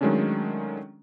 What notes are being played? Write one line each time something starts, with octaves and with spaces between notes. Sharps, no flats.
D#3 F#3 G#3 A3 C#4 D4